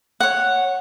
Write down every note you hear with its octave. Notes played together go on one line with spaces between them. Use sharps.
C#5 F#5